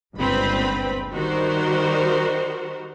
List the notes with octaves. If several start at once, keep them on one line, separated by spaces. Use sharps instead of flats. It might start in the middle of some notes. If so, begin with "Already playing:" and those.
G1 C#2 A#2 C4 B4 B5
D#3 G3 F#4 A#4 C5